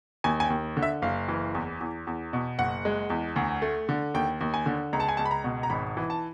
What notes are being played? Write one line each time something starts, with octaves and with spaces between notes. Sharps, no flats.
D#2 G#5
G#5
G5
D#2
D3
E5
F#1 F5
E3
E2
E2
E2
B2
F#1 F#5
G#3
E2
D2
A3
D3
D#2 G5
D#2
G#5
D3
C#2 A#5
A5
G#5
C#2 A5
B5
A#5
B2
A#5
G#1 B5
E3
A5